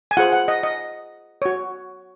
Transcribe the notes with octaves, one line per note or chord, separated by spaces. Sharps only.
G#5
F4 G#4 C5 F#5
F#5
D#5
D#5
F#4 C#5